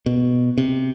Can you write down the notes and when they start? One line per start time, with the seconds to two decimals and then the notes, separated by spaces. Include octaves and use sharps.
0.06 B2
0.58 C3